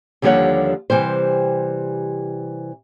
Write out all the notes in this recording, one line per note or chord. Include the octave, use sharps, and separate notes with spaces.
D#2 D3 F3 G3 C#5 F#5
C3 E3 G3 C5